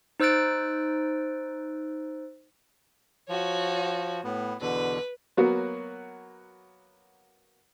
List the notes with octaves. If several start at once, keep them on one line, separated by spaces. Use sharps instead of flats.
D#4 C5 E6 F#6 A6 D7
F3 F#4 C#5
A2 B3
E2 B2 D3 B4
F#3 A#3 B3 F#4